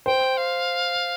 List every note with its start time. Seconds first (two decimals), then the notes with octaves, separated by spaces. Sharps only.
0.06 C5 G5
0.37 F5